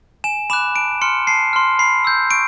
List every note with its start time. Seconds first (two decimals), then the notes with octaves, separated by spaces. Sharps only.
0.24 G#5 E7
0.50 B5 D6 F#6 E7
0.76 A5 D7
1.02 C6 F6 C#7
1.27 A5 C7
1.53 C6 F6
1.79 B5 C7
2.05 E6 G6
2.31 C#6 D7